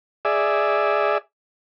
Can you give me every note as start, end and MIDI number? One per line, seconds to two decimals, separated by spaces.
0.25 1.18 68
0.25 1.18 74
0.25 1.18 76